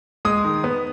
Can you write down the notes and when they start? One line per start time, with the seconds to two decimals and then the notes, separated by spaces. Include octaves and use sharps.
0.25 G#3 D#6
0.44 D#3
0.64 B3